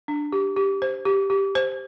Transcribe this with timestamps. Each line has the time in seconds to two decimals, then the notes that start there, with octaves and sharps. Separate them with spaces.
0.08 D4
0.32 G4
0.56 G4
0.82 C5
1.05 G4
1.30 G4
1.55 C5